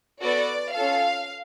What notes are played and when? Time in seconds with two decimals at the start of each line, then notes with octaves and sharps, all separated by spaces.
0.22 B3 F#4 A4 D5
0.75 C#4 F4 A4 F5